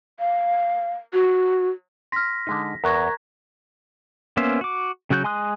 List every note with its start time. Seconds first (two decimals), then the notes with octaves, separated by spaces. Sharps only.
0.19 F5
1.13 F#4
2.12 C6 F6 A#6 B6
2.47 D3 G#3 D#4
2.84 E2 A#4 A#5 C#6 F#6 G#6 A#6
4.37 A#3 B3 C#4 C5 E5
4.61 F#4 D6
5.10 C#3 F#3 F#4 F#6 G6
5.24 G#3 G#5 C6 D#6 F#6